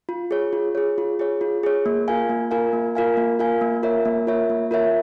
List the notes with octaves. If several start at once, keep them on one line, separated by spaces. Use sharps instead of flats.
F4
G#4 C#5
F4
G#4 C#5
F4
G#4 C#5
F4
G#4 C#5
A#3
F4 A#4 F5 G#5
A#3
F4 A#4 F5 G#5
A#3
F4 A#4 F5 G#5
A#3
F4 A#4 F5 G#5
A#3
F4 A#4 C#5 E5
A#3
F4 A#4 C#5 E5
A#3
F4 A#4 C#5 E5